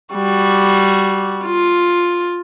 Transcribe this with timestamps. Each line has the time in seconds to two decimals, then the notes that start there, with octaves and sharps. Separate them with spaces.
0.14 G3 F#4
1.44 F4